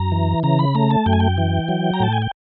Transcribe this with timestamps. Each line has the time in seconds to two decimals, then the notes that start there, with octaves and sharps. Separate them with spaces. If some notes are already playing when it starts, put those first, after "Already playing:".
Already playing: F#2 A#5
0.12 E3
0.43 C#3 A#5
0.59 B5
0.75 A3 A#5
0.90 A5
1.06 F#2 G5
1.13 G#5
1.20 G5
1.38 E3
1.68 F#3
1.94 A#5
2.00 A2 A5
2.13 G#5
2.22 G5